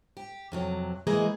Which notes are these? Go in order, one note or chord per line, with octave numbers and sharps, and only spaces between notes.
G4
F2 C3 F#3
E3 G#3 A#3 G#4 D#5